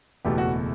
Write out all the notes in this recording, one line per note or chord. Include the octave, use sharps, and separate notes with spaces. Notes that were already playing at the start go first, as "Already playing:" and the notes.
F#1 E2 B2 A3 G4
F#4